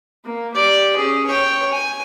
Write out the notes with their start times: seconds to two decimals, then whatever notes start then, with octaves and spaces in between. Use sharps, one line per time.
0.25 A#3
0.54 G4 D5
0.96 C#4 G#4
1.26 C#5 G5
1.72 G#5